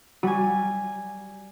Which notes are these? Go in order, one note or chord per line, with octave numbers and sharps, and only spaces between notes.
G3 F#4 G#5